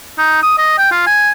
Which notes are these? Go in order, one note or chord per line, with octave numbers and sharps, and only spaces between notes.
D#4
D#6
D#5
G5
F4
G#5